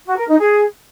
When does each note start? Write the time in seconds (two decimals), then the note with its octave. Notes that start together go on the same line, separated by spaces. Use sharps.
0.05 F#4
0.16 A#4
0.27 D#4
0.38 G#4